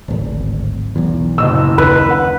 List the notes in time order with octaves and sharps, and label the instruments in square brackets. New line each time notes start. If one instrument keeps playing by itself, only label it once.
[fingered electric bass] D1 G#1
B1 E2
[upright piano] F#1 D#5 E6 [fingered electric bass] A#2
[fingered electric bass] D#2 D4 [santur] B4
[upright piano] F#5